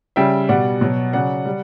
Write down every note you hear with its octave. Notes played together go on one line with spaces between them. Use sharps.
C#3 G3 E5 G5
B2 G3 D5 F#5
B2 F#3
C#3 F#3 D5 F#5
G3